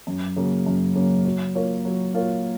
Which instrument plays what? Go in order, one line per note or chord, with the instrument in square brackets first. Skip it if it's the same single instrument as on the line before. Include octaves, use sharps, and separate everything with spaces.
[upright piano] F#2
C#3 F#3 A#3
F#2
C#3 F#3 A#3
F#3
A#3 F4 A#4 C#5
F#3
A#3 F4 A#4 C#5